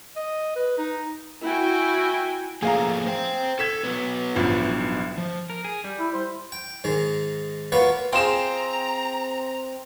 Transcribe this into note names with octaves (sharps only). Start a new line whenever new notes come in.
D#5
B4
D#4
E4 F#4 G5 G#5
F3 A3 A#3 G#4 F5 A#5
C5 G5
A4 G#6 B6 E7
F#3 B3 B4
A1 G2 F3
F3
A#4
G#4
G3
E4
C5
G5
G#2 D#3 G#3
A#3 B3 F4 F#4 B4 C#5
C4 F4 G#4 G5 A#5 C6 E7